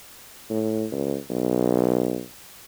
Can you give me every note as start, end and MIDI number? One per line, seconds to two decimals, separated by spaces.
0.50 0.86 45
0.92 1.17 37
1.30 2.20 35